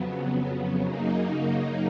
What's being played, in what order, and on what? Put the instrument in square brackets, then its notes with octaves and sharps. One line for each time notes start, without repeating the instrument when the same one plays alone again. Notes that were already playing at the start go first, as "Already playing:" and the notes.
Already playing: [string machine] F2 C#3 F#3 B3
F#2 C#3 F#3 A#3 D#4